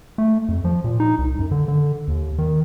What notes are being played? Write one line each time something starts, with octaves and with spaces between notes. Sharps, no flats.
A3
F2
F3
A#2
D#4
C2
F#2
D3
D3
D#2
D#3